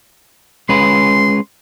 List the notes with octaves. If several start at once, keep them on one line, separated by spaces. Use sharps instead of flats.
G#3 C#4 B4 C6